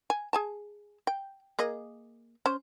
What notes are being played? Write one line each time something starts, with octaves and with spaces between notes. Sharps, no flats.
G#5
G#4 G#5 A5
G5
A#3 G#4 D#5
C#4 C5